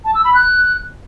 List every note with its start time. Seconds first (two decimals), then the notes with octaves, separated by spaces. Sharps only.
0.05 A5
0.15 E6
0.25 B5
0.34 F#6